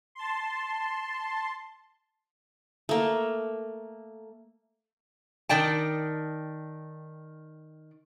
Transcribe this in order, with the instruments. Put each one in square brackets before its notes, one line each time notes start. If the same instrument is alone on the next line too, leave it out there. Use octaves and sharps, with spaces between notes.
[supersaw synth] A5 C6
[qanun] A3 A#3
[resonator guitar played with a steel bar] D#3 D5 G5 A5